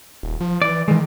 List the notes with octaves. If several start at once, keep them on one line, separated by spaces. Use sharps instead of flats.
D#1
F3
E3 D5
D#3 E3 G#3